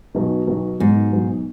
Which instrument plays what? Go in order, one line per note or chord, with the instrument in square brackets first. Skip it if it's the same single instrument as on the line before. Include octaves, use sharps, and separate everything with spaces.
[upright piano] B1 B2 F#3 D#4
B1 B2 F#3 D#4
[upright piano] B1 B2 F#3 D#4 [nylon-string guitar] G#2
[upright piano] B1 B2 F#3 D#4